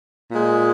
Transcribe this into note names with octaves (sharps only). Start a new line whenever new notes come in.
A#2 G#3